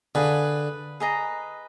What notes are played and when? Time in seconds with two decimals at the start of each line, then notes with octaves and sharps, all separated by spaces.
0.15 D3 G#4 B4 F5
1.00 G#4 B4 D#5 A#5